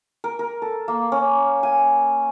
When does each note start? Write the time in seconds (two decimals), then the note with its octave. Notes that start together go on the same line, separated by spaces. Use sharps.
0.24 A#4
0.39 A#4
0.62 A4
0.88 A#3
1.12 C#4
1.63 G#5